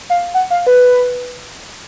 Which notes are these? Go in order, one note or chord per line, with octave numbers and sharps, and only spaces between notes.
F5
F#5
F5
B4